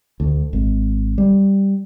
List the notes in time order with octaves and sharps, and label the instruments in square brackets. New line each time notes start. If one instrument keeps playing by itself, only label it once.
[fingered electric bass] D2
G#1
G3